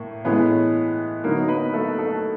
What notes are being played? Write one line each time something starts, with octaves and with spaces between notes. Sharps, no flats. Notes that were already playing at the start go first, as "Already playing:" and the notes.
Already playing: A2 A#3
A2 E3 G#3 B3 C#4 B4
D3 F#3 A#3 B3 D#4 A#4
B3 B4
A3 A4
A3 A4